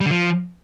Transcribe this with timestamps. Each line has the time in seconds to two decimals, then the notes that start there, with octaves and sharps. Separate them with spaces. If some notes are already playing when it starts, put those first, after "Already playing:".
0.01 G3
0.06 D3
0.11 F3